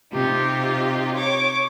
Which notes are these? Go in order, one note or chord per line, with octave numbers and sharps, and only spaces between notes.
C3 D#4 F4 G4
C#5 C#6 D6